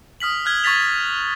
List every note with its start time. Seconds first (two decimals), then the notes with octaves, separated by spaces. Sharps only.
0.20 D#6 F6 B6 F#7
0.45 F6 F#6 G#6 G7
0.64 C#6 G#6 A6 B6 F7